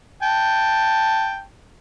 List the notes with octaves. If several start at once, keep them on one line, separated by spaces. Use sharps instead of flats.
G5 A5